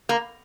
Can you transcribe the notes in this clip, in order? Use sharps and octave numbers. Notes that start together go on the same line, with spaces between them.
A#3